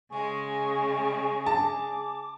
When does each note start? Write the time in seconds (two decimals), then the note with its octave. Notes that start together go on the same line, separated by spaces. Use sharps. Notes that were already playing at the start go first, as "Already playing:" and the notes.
0.11 C#3 G#3 G#4 C#6
1.46 A5 D6